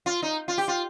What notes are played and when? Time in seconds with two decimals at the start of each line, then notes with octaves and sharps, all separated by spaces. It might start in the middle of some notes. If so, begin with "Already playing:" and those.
0.06 F4
0.22 D#4
0.48 F4
0.58 G4
0.68 F4